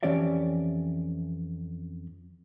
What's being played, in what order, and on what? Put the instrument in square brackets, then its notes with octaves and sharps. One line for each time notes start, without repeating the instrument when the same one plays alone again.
[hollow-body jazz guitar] F2 E3 C#4 G4 D5 E5